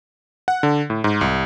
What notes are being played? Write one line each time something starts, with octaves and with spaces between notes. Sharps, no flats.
F#5
D3
A2
G#2
C2